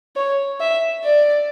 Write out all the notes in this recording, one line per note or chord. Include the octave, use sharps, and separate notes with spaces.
C#5
E5
D5